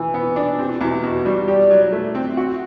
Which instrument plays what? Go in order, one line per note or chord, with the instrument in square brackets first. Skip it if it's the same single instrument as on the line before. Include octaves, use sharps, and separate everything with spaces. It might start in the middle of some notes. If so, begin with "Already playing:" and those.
Already playing: [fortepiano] E3
B3
D4
[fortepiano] C4 [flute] G4
[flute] E4
[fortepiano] E2 [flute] F#4
[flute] G4
[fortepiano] B2 [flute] F#4
[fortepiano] G3
[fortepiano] G4 [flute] D5
[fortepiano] F#3
[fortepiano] A3 [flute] E5
[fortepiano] C4
F#4